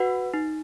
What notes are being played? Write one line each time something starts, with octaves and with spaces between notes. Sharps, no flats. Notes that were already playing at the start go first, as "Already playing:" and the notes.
Already playing: F#4 B4 F#5
D#4